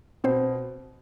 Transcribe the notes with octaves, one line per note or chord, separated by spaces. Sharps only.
B2 C4 C5